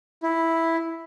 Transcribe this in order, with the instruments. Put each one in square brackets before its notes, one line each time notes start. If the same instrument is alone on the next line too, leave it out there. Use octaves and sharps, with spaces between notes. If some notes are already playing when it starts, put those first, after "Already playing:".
[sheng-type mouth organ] E4